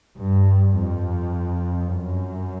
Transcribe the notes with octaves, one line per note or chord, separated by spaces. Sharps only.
G2
F2
F#2